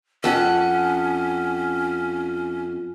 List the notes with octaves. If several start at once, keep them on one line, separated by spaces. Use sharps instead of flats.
F2 C#4 F#5